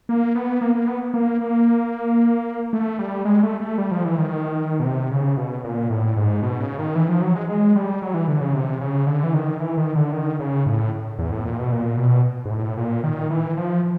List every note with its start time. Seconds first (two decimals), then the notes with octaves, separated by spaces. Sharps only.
0.09 A#3
0.35 B3
0.61 A#3
0.75 A#3
0.87 B3
1.14 A#3
1.41 A#3
2.73 A3
2.99 G3
3.25 G#3
3.43 A3
3.60 A3
3.78 G3
3.91 F3
4.05 E3
4.18 D#3
4.80 B2
4.85 C3
5.11 C#3
5.37 B2
5.64 A#2
5.90 A2
6.16 G#2
6.42 B2
6.60 C#3
6.78 D#3
6.95 E3
7.09 F3
7.22 F#3
7.35 G#3
7.49 G#3
7.76 G3
8.02 F#3
8.14 E3
8.28 D3
8.41 C#3
8.54 C3
8.81 C#3
9.07 D3
9.23 E3
9.34 D#3
9.60 E3
9.77 D#3
9.95 D3
10.12 D#3
10.40 C#3
10.66 A2
11.19 E2
11.32 A2
11.45 A#2
11.59 B2
11.72 A#2
11.97 B2
12.45 G#2
12.51 A2
12.77 A#2
13.04 D#3
13.30 E3
13.57 F3